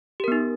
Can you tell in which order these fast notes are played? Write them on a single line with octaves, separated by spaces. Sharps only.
G4 A#4 B3 D#4